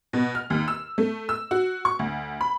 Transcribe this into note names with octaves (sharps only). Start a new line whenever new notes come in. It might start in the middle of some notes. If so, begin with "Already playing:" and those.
B2
F6
D#2
E6
A3
E6
F#4
C#6
D2
B5